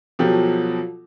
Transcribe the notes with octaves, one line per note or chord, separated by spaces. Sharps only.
B2 F3 F#3 G4 A4